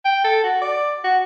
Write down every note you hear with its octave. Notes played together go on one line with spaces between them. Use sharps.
G5
A4
F#4
D5
F#4